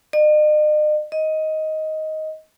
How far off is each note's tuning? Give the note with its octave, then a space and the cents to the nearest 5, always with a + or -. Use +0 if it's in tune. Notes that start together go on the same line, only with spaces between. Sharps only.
D#5 -45
D#5 +10